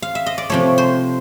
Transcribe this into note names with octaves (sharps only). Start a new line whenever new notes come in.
F5
E5
D#5
D5
C3 F3 A3 C#5
C5